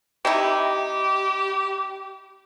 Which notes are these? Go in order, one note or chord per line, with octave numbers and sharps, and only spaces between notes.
C3 D#4 E4 G4